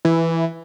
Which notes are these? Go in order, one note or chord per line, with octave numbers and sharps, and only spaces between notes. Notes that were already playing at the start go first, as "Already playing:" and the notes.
E3